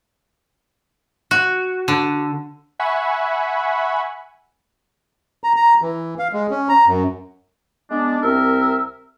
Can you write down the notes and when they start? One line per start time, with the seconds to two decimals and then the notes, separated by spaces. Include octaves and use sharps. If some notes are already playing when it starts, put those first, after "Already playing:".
1.31 F#4
1.88 D3
2.79 E5 F#5 G#5 B5 C#6
5.44 A#5
5.56 A#5
5.82 E3
6.19 F5
6.33 G#3
6.50 C#4
6.69 A#5
6.87 F#2
7.91 G#3 B3 D4
8.23 C2 C4 A#4 E5 E6